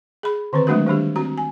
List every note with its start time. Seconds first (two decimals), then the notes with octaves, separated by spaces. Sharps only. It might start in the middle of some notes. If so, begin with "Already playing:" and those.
0.23 G#4 B5
0.53 D3 D#3 C4 B4
0.67 F#3 G#3 A3 D4 F#4 A#4
0.87 D#3 G3 D4 G4
1.16 C4 F#4 A#5
1.38 G#5